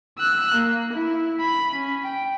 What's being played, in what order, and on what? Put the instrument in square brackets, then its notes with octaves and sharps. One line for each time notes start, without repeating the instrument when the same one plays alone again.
[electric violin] E6 F#6
A#3
E4
B5
C#4
G5